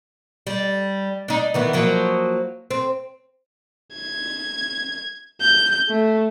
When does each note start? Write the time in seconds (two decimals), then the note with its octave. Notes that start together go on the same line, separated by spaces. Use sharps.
0.47 G3
1.28 D4 D#4
1.54 D#3 E3 B3
1.73 F3 F#3 A#3
2.71 C4
3.94 G#6
5.41 G6
5.88 A3